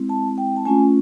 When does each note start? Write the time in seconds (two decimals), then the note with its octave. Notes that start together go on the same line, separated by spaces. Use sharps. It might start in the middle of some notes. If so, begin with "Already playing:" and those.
Already playing: G#3 C4 E4
0.09 A5
0.38 G5
0.56 A5
0.65 A3 C#4 F4 G#5